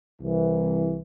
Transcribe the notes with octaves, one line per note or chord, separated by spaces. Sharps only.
C2 E3